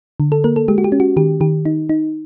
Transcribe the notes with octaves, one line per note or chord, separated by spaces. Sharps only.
D3
A4
A#3 A#4
A4
G#3 G4
F#4
G4
C#4
F#4
D#3 G4
D#3 G4
D#4
D#4